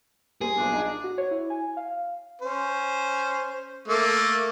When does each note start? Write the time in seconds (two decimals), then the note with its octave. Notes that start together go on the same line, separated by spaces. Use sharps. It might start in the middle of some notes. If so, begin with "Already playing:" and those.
0.41 G3 A#3 G#4 C5
0.56 B1 A#2 D4
0.73 D#4
1.04 F#4
1.18 C#5
1.31 E4
1.50 G#5
1.77 F5
2.41 C#4 C5
3.88 A3 A#3 D6